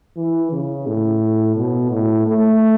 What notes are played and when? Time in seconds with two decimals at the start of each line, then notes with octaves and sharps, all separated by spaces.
0.16 E3
0.52 C#3
0.87 A2
1.56 B2
1.92 A2
2.27 A3